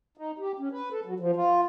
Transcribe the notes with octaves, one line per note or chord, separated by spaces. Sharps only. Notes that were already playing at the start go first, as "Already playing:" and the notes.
D#4
G4
C#4
B4
A4
F#3
F3
F4